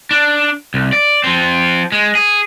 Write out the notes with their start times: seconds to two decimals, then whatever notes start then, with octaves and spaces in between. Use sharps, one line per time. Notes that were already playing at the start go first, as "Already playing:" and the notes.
0.11 D4
0.74 C2
0.93 D5
1.24 F3 C4
1.92 G#3
2.15 G#4